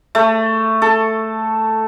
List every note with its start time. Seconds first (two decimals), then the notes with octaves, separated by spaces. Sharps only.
0.15 A3
0.82 A4